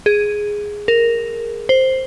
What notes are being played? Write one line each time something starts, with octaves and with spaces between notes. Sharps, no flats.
G#4
A#4
C5